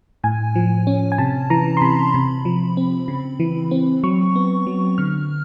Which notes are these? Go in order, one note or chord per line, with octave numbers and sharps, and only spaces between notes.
A2 G#5
F3
C#4
G#5
C3 A5
E3 A#5
C6
C3 B5
C3
F3
C4
C#3
E3
C4
F#3 C#6
B3
F#3
D3 F6